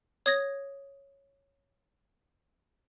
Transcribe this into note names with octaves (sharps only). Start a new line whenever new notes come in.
C#5 D#6 G#6 A#6